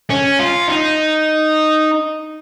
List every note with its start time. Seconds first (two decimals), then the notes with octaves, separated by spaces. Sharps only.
0.10 C#4
0.39 F4
0.68 D#4